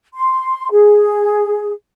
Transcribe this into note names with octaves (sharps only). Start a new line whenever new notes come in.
C6
G#4